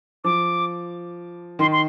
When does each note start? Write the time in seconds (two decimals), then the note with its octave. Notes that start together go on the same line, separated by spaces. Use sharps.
0.24 F3 D6
1.59 D#3 C6
1.72 C6